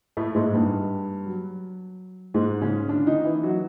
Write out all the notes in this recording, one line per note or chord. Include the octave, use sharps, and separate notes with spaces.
A2 A3
G#2 G#3
G2 G3
F#3
G#2 G#3
C#3 C#4
D3 D4
D#3 D#4
E3 E4
F#3 F#4